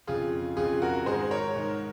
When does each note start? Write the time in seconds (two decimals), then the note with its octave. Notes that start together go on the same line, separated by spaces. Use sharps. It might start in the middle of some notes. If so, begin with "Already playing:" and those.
0.07 F2 C#3 F4 G#4
0.57 F2 C#3 F4 G#4
0.82 F#4 A#4
1.06 G#2 D#3 G#4 C5
1.31 A#4 C#5
1.56 G#2 D#3